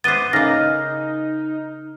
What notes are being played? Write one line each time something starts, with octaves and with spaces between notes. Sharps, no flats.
B3 E4 C5 D6 F#6 A6 D#7 G7
C#3 A#3 D#4 F6 A#6